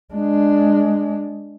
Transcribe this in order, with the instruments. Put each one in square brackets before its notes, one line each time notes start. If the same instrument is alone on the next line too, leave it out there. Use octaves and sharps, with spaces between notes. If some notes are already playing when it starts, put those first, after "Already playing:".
[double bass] G#3 D4